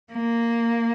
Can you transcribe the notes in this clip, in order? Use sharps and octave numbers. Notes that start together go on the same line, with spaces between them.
A#3